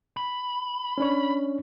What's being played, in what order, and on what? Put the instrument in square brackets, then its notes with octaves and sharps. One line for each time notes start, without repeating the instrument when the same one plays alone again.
[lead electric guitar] B5
[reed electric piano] C#4 D4 C#5